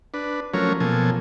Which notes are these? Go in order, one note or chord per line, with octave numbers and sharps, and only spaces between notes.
D4 B4
F3 F#3 A3 C#4 A#4 C#5
B2 F3 A#3 A4 G#5